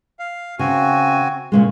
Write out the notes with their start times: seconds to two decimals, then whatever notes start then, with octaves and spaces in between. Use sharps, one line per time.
0.19 F5
0.59 C#3 C4 F#4 G#5
1.52 A#2 C#3 G#3